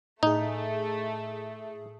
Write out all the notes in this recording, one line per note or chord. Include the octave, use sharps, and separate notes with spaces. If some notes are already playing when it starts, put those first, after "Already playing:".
A2 A3 D#4 G#4